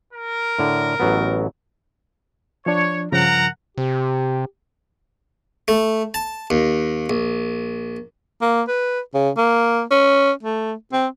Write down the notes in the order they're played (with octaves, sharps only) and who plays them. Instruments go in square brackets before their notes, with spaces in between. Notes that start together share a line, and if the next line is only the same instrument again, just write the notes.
[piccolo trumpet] A#4
[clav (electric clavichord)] A2 D3
A1 F#3 B3
[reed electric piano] F3 D4 [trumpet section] C#5
[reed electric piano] G2 C#3 F3 [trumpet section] A#4 F#5 A#5
[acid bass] C3 [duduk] G4
[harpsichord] A3
A5
D#2
A#1
[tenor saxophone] A#3
B4
C#3
A#3
C#4
A3
C4